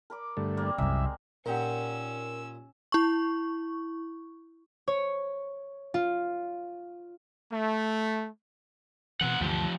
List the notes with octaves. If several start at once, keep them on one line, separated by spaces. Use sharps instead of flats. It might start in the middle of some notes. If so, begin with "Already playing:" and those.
A#4 B5 D6
G2 D3 A3
G3 A#3 C4
C2 F#2 G#3 E5
A#2 C#4 D#4 G4 A#4 F#5 E6
E4 C#6
C#5
F4
A3
B2 E3 C4 F#5
D2 G2 E3 F3 G4